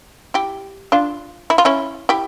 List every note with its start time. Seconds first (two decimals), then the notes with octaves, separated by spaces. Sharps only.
0.34 E4 G4
0.92 D4 F4
1.50 E4
1.58 F4
1.65 C#4 E4
2.09 E4 G4